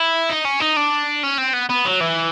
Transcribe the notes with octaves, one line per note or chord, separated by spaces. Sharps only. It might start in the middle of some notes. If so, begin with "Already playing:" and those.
Already playing: E4
D#4
C#4
D#4
D4
C#4
C4
B3
B3
F#3
E3